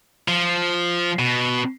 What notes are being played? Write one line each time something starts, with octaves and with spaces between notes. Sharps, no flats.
F3
B2